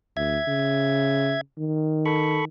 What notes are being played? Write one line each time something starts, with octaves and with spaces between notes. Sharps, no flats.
D2 E5 G#6
C#3
D#3
A4 B5 C#6